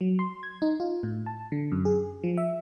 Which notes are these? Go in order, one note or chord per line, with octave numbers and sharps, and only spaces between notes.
F#3
C6
G#6
D#4
F4
A2
A5
D3
F#2
G#4
F3
E5